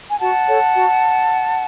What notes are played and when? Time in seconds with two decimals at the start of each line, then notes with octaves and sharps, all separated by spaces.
0.10 G#5
0.19 F#4 F#5 A5
0.47 A4 C#5
0.75 F#4